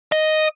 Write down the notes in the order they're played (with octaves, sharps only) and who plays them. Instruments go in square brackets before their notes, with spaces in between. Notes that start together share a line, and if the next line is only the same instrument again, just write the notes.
[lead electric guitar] D#5